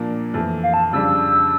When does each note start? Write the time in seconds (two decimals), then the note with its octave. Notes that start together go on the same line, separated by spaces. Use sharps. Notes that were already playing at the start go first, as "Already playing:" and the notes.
Already playing: A#2 F3 A#3 D4
0.34 F2 E3 A3
0.63 F5
0.74 A5
0.93 F2 C#3 G3 D4 E6